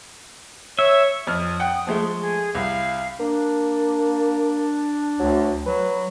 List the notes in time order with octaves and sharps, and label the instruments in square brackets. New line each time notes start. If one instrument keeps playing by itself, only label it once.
[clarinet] C#5 [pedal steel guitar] E5
[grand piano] F2 F6 [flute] D#6
[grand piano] F#5 G5 F#6
F3 G#3 A3
[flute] G#4
[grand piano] C2 [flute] F5
[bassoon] A#3 [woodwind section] D4
[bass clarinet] D2 [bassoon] F#3
[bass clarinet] F#3 [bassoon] B4